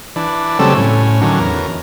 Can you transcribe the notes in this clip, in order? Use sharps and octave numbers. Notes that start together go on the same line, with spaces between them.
E3 D4
C#3 F#3 G3 A3 C4 A4
A2 C#4
D3 D#3 F#3 C#4
E2 A#4